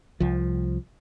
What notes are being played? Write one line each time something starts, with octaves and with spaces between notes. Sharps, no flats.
C2 F3